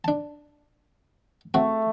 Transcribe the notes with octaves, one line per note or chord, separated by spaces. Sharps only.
D4 A5
A3 C4 F#4